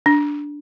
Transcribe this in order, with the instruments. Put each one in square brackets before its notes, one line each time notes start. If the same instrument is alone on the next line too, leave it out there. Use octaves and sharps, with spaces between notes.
[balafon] D4